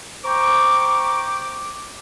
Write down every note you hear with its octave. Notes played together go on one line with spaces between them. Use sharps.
C5 G5 A#5 C#6 D6